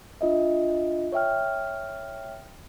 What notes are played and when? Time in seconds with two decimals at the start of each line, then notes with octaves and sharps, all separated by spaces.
0.21 D4 F4 D#5 E5
1.12 C#5 E5 G5 F6